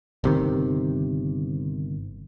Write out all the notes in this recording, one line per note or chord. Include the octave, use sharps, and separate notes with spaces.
G1 C3 D#3